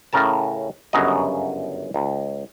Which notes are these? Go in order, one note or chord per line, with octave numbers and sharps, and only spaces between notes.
A2 C#3 C#4 A#4 A5
G1 F#2 C#3 F#3 D#5
C#2